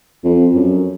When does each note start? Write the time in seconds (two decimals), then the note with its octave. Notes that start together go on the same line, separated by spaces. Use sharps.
0.24 F2
0.55 F#2